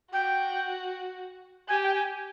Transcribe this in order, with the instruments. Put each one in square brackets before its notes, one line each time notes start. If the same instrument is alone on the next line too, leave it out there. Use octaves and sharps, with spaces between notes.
[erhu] F#4 [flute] G5
[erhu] G4 [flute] G#5
[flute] G5
G#5